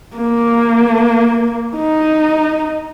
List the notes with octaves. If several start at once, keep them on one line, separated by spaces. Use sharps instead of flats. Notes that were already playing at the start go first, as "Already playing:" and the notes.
A#3
D#4